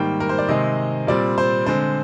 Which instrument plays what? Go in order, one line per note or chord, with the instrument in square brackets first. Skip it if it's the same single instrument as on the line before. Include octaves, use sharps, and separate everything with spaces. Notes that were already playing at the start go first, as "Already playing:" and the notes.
Already playing: [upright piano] G#2 D#3 G3 A#3 G5
A#4
C5
D5
C3 D#3 G#3 C4 D#5
A#2 G3 C4 D5
C5
D3 G#3 C4 C5